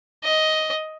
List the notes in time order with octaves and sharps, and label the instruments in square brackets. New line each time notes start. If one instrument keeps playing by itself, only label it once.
[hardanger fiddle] D#5